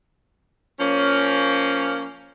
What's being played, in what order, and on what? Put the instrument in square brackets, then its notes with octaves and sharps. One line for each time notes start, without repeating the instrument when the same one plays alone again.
[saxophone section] F3 A#3 C#4